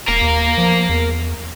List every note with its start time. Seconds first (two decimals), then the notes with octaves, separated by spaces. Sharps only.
0.08 E1 A#4 F5
0.22 D#2
0.58 F3
0.89 E2